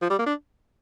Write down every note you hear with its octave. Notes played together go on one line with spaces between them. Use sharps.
F3
G3
A#3
D4